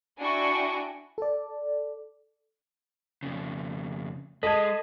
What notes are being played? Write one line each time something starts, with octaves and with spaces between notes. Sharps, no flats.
D4 E4 F#4 G5 G#5 C#6
A4 D5
F2 C#3
G#3 A4 D#5 A5 G#6